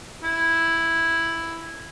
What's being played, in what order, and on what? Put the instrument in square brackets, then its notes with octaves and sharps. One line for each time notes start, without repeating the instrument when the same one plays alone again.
[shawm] E4